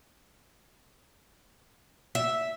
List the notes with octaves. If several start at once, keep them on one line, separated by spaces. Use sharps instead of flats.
E5